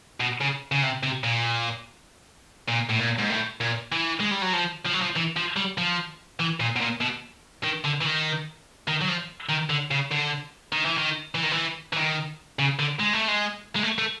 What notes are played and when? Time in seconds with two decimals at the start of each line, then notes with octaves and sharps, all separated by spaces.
0.20 B2
0.41 C#3
0.72 C#3
0.83 C3
1.03 C3
1.24 A#2
2.68 A#2
2.89 A2
2.99 A#2
3.18 G#2
3.30 A2
3.61 A#2
3.92 E3
4.20 G#3
4.31 G3
4.42 F#3
4.53 F3
4.85 F3
4.93 F#3
5.02 F3
5.16 E3
5.36 F3
5.56 G3
5.78 F3
6.40 E3
6.60 A#2
6.76 B2
6.81 A#2
7.01 B2
7.63 D#3
7.84 D3
8.01 E3
8.05 D#3
8.88 D#3
9.01 F#3
9.08 F3
9.49 D#3
9.70 D3
9.91 C#3
10.11 D3
10.72 D#3
10.85 E3
10.97 D#3
11.35 E3
11.43 D#3
11.52 E3
11.93 E3
11.96 D#3
12.59 C#3
12.79 D3
13.00 G#3
13.13 A3
13.28 G#3
13.76 G#3
13.83 A3
13.98 A3